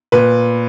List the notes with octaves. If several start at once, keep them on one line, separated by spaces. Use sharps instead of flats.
A#2 B4